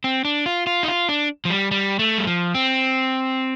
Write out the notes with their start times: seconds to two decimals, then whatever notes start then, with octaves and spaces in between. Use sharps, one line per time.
0.04 C4
0.25 D4
0.46 F4
0.67 F4
0.83 D#4
0.88 F4
1.09 D4
1.45 F3
1.50 G3
1.71 G3
1.99 A3
2.18 G3
2.27 F3
2.55 C4